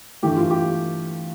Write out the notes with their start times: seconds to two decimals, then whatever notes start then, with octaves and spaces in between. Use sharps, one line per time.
0.22 G2 E3 A3 G4
0.37 F4
0.51 G4